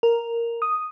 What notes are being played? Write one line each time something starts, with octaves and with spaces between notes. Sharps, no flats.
A#4
D#6